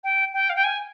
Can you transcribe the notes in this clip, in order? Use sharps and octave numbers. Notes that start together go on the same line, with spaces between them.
G5
G5
F5
G5
G#5